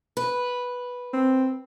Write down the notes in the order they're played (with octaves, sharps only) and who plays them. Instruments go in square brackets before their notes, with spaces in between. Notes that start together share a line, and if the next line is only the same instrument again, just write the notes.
[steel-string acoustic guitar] B4
[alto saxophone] C4